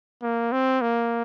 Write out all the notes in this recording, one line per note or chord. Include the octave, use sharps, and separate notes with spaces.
A#3
C4
A#3